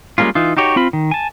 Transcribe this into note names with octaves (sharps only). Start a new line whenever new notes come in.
G3 G#3 A#3 C#4 F4
E3 D#4 F4
D#4 F#4 G4 C#5
C4 F4 B5
D#3
G#5 A5